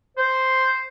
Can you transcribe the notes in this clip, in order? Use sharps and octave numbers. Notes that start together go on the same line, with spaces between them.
C5